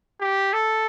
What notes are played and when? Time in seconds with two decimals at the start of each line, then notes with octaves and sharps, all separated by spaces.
0.20 G4
0.53 A4